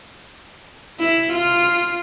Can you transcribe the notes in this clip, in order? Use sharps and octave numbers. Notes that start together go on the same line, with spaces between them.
E4
F4